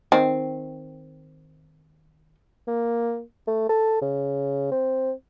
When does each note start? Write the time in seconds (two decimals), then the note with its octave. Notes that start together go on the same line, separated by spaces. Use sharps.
0.12 D#3 C4
2.67 A#3
3.47 A3
3.69 A4
4.01 C#3
4.71 C4